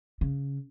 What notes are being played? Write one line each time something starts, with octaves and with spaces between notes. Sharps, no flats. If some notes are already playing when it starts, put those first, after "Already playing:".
C#3